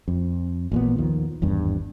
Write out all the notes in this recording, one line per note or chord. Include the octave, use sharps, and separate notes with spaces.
F2
A1 A#2 B3
D#2 D#3 F3
G#1 E2 G2